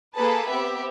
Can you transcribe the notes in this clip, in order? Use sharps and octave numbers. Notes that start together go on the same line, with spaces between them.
A#3 G#4 A4 B4 A5
B3 C4 G4 E5